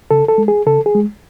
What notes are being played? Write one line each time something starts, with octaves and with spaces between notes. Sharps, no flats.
C#3 A4
A4
G#3
G#4
C#3 A4
G#4
G#3